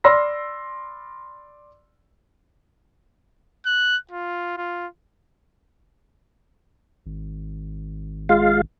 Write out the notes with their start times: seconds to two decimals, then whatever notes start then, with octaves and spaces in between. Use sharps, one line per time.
0.04 D5 B5 C6 E6 F6 A#6
3.66 F#6
4.11 F4
4.57 F4
7.06 G#1
8.29 G#3 F4 F5